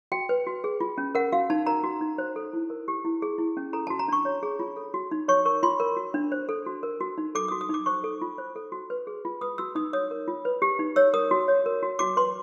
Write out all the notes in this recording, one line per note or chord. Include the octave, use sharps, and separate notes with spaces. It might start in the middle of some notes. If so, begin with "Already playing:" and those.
F#4 G5
B4
F#4
G#4
F4
C#4
A#4 F#5
F#4 F5
D#4 A5
A#4 A#5
F#4
D#4
C5
A4
E4
A#4
G4
E4
G#4
E4
C#4
A4 A#5
F#4 A5
A#5
D4 C#6
C#5
G#4
F4
A4
F#4
D#4
C#5 C#6
A#4 C#6
F4 C6
A#4
F#4
D4
C5
A4
F#4
A#4
F#4
D#4
A4 D6
F#4 D#6
D#6
D#4 D6
C5 C#6
A4
F4
C5
A4
F#4
B4
G#4
F4
B4 D#6
F#4 E6
D#4 D#6
C#5 D#6
A#4
F4
B4
G4
D#4
C#5 E6
A#4 D#6
F#4
C#5
A#4
F#4
F#4 D6
B4 C6